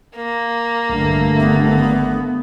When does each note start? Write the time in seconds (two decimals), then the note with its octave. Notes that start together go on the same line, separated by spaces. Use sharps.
0.16 A#3
0.89 A#1 G2 D3 A3
1.40 G#1 B3